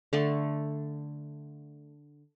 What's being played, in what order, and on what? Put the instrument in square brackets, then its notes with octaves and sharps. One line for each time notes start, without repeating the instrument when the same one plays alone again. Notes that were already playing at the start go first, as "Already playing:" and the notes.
[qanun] D3 A3 A5